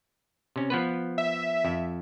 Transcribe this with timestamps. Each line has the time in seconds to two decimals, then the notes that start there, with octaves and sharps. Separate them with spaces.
0.56 C3 C#4
0.70 F3 B3 B4
1.18 E5
1.65 F2